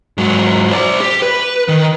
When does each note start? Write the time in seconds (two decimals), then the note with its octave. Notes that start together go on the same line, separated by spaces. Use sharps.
0.18 G#2 F#3
0.71 C5 D5
1.01 G4
1.22 B4
1.68 D#3